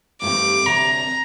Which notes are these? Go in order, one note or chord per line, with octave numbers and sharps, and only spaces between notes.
G2 D#3 A3 C4 G4 D6
D2 C3 F#3 A#5